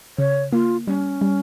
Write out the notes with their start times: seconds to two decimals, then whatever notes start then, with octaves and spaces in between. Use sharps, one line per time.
0.18 C#3 C#5
0.53 A#3 F4
0.87 G3 C#4
1.21 G3